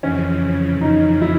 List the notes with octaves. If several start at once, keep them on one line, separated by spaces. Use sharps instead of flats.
F2 C#3 E3 C#4
F2 C#3 E3 D#4
E4